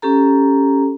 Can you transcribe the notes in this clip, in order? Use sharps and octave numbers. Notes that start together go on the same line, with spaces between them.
C#4 G4 A4 A#5